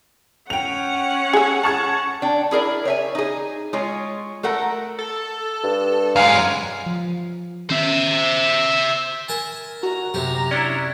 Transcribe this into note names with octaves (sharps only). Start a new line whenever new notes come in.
C#4 F#5 G5 F7
G#4 A4
A5 C#6 G#6
D4 G5
E4 G#4 A#4 D5
C#5 E5 G#5
D#4 G#4
G#3 F4 G#4 C#5
A3 A4 A#4 F#5
A4
G2
F#2 G#3 F5 G#5
F3
D#3 C#4 C5 E5
A#4 G#5 A5
F#4 A#5
F#2 C3 G4
C#4 D4 E4 D5